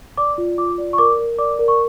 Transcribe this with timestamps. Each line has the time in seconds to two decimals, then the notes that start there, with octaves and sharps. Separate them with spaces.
0.18 D5 D6
0.38 F4
0.58 F4 D6
0.78 D5
0.93 C#6
0.98 A#4 D6
1.19 A#4
1.38 D5 D6
1.59 A#4
1.68 C#6